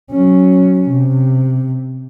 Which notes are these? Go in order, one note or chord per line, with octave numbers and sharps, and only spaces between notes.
F#3 C#4
C3